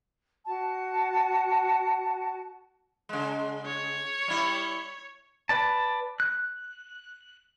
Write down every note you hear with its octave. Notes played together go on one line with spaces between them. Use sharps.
F#4 A5
C#3 G#3
C#5
G3 E4
B4 D5 A5
F#6